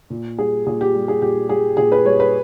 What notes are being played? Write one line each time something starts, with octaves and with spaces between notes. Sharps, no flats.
A#2
G3 G#4
A#2 G#4
G4
G3
G#4
A#2 G4
G3 G#4
A#2 G#4
B4
G3 C#5
B4